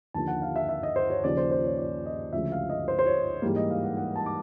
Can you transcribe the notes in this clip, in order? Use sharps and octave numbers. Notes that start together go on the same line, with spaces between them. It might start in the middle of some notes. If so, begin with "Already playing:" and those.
D#2 D3 F3 A#3 A5
F#5
F5
E5
E5
D#5
C5
C#5
D#2 C#3 F3 D5
C5
C5
C#5
D5
D#5
D2 C#3 F3 G#3 E5
F5
D#5
C5
C5
C#5
G#2 E3 G3 A#3
D#5
F5
F#5
F#5
A5
D6